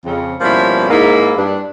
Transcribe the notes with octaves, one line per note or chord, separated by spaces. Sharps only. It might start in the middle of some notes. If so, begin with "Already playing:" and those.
F2 C#3
B2 F3 G3 A#3 C#4 E4
G#2 A#3 E4
G2 D4